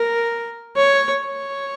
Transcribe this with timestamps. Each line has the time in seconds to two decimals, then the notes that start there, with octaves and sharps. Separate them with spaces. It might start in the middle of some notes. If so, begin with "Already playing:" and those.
Already playing: A#4
0.76 C#5
1.25 C#5